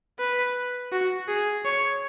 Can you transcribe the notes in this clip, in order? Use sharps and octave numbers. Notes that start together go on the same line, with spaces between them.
B4
F#4
G#4
C#5